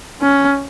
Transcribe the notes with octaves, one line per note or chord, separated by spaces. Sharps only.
C#4